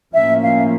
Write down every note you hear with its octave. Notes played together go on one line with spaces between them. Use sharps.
A2 F3 A#3 C#4 E5
F5